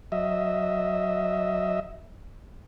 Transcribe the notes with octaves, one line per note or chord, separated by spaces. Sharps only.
F#3 D#5 E5